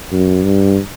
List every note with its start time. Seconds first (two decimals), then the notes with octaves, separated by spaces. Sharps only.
0.12 F#2
0.45 G2